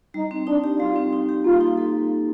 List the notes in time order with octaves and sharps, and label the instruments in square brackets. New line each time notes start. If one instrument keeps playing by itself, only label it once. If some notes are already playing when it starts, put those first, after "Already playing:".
[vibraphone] G3 [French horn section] D#4
[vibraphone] C4
[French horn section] D4 [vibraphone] D#4
[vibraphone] G4
[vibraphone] G3 [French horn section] F4
[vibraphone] C4
D#4
G4
[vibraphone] A#3 [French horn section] F4
[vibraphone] D#4
A4